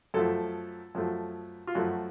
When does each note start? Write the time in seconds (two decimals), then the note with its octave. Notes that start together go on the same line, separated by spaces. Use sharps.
0.14 F#2 F3 A3 A4
0.95 F#2 F3 A3
1.67 F4
1.75 F#2 F3 A3 F#4